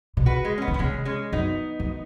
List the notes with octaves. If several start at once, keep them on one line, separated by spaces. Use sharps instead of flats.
B2
C#3 F#4 B4
G#3
C#4
B3
D#3
B3
C#3 G#3 C#4
G#3 C#4
F#2 B3 D#4
F#2